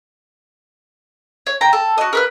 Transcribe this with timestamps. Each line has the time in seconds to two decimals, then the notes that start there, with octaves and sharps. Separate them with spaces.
1.47 C#5
1.61 G5 A#5
1.73 A4
1.98 F#4 D#5
2.13 A#4 B4 F6